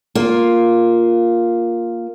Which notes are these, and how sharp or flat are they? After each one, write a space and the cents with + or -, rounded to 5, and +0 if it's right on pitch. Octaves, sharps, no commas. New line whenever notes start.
A#3 +0 F4 +0